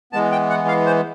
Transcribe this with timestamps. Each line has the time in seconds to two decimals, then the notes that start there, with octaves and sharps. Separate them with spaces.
0.13 E3 G#3 B3 A5
0.32 G5
0.50 F#5
0.68 F5
0.86 C5